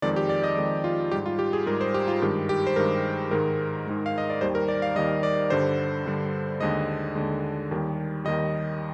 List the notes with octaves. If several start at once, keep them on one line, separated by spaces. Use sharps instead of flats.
F2 D#3 G#3 D5
G4
D5
D#5
F2 D#3 G#3
F4
G#2 G3 G4
F4
G4
G#4
G#2 G3 A#4
C5
G4
F4
G2 D#3 G#3 G4
G4
C5
G2 D#3 G#3 A#4
G#2 D#3 G#3 A#4
G#2 D#3 G#3
F5
D#5
D5
D#2 D#3 G3 C5
A#4
D5
F5
D#2 D#3 G3 D#5
D5
G2 D3 G3 C5
G2 D3 G3
D#2 D3 G#3 D#5
D#2 D3 G#3
D#2 D#3 G3
D#2 D#3 G3 D#5